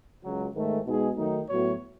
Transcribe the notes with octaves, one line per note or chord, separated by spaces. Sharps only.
C#2 C#3 F#3
G#2 D#3 A3
B2 G#3 D#4 G#4
D#3 F#3 A3 D#4
A2 F#3 B3 F#4 C#5